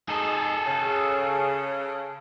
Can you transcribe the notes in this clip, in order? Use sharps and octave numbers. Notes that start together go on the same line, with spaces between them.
F2 G#3 D#4 G#4 A4
C#3